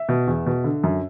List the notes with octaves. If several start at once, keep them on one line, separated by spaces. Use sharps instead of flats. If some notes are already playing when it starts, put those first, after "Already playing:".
Already playing: E5
B2
E2
B2
D3
F#2